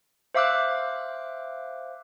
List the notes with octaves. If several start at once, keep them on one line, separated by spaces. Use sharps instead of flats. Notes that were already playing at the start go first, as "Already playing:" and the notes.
C5 E5 F5 D6 E6 F#6